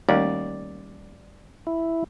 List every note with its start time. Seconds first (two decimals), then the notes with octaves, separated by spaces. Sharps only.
0.09 D#2 G3 A3 C#4 D5
1.67 E4